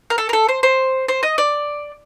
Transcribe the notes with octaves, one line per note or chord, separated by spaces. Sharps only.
A#4
A4
A#4
A4
C5
C5
C5
D#5
D5